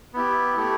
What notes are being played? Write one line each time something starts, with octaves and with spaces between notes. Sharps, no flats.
B3 E4 G4
A3 E4 G4